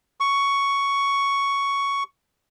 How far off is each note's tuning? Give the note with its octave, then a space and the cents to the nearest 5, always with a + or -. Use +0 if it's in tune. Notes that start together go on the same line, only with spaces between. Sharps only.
C#6 +5